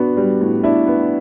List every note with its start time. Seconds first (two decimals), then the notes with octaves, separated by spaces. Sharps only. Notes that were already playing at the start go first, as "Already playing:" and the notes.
Already playing: B3 D4 F#4
0.17 G3
0.41 A2
0.63 D4 E4
0.87 B3